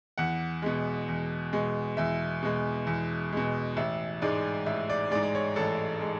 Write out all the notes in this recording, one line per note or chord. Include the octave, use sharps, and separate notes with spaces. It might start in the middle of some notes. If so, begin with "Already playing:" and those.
E2 F#5
B2 G#3
E2
B2 G#3
E2 E5
B2 G#3
E2
B2 G#3
A1 E5
G#2 G#3 D5
A1 E5
D5
G#2 G#3 D5
D5
C#5
A1 A4
G#3